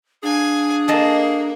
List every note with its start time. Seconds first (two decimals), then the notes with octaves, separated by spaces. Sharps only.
0.23 D4 G#4 F5 G#5
0.88 A#3 A4 D#5 A5